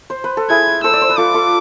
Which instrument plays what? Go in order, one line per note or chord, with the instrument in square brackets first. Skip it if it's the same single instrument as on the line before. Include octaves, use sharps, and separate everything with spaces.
[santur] C5
B4
A4
[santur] E4 G#4 [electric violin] G#6
[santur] A4 C5 [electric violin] E6
[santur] D5
C5
B4
[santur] F4 A4 [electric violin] D6
[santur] F4 A4